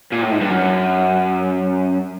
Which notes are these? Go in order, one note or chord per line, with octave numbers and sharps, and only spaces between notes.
A#2
A2
G#2
G2
F#2